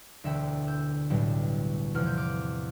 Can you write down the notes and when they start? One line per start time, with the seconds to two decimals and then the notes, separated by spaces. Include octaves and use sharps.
0.24 E1 D2 D3 E5 G5
0.67 E6 G6
1.10 B1 A2 G3
1.95 E2 C3 F3 F6
2.06 G6
2.17 D6 F6